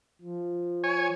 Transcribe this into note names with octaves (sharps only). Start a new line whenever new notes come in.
F3
C#5 G#5